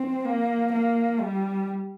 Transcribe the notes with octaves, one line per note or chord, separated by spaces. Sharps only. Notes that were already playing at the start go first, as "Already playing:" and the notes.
Already playing: C4
A#3
A#3
G3